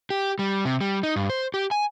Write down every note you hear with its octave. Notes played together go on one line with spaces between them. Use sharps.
G4
G3
C3
G3
D#4
G2
C5
G4
G#5